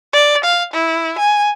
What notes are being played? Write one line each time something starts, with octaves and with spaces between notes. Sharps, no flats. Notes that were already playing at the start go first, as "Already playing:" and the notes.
D5
F5
E4
G#5